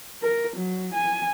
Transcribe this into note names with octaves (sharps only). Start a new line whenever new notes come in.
A#4
F#3
G#5